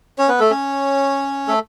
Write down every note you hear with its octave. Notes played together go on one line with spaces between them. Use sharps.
C#4 C#5
B3 B4
A3 A4
C#4 C#5
A3 A4